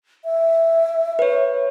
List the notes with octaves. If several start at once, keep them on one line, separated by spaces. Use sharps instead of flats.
E5
B4 C#5